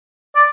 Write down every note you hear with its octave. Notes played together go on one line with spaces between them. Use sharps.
D5